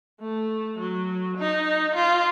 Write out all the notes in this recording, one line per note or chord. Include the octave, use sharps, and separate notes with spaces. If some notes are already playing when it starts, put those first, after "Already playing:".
A3
F#3
D#4
F4